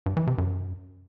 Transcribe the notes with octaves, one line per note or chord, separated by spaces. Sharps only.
G2
E3
C3
F#2